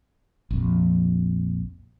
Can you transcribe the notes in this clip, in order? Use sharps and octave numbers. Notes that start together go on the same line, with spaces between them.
A#1 F2